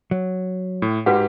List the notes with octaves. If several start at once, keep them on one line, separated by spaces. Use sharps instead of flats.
F#3
A2
G#2 F#4 G4 B4 F#5